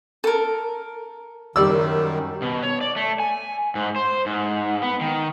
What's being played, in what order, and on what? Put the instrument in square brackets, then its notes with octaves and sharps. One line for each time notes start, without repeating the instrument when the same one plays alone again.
[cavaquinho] A4 A#4
[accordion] F#2 D#3 [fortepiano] G3 D5 E6
[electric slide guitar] B2
C#5
D5
A3
G#5
G#2
C5
G#2
B3
D#3